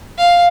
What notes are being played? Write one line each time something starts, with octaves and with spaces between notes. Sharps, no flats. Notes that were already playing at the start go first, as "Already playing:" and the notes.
F5